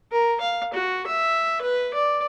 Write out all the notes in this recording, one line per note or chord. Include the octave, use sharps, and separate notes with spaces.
A#4
F5
F#4
E5
B4
D5